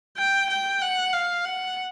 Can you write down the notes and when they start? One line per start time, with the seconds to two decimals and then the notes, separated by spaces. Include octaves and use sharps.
0.18 G5
0.50 G5
0.82 F#5
1.13 F5
1.45 F#5